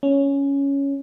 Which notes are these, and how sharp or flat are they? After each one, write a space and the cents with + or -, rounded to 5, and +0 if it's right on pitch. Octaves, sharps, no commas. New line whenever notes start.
C#4 +5